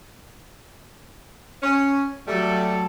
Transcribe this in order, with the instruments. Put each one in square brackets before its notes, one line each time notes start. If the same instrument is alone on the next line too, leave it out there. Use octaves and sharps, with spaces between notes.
[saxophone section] C#4
[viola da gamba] F#3 A4 [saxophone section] G3 A3